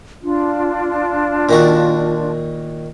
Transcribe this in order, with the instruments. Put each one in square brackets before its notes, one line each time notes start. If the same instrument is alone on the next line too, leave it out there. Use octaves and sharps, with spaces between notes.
[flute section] D4 F4
[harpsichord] A#2 D#3 F#4